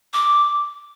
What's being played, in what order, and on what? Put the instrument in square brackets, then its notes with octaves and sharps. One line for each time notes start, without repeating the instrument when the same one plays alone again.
[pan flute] D6